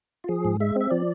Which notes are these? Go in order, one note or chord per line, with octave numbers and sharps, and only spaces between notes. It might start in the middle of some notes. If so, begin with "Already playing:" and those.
F4
F3 G#4
G#2
G#3 E5
C4 E5
F3 D5